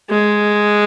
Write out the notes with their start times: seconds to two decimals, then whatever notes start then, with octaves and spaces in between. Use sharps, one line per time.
0.10 G#3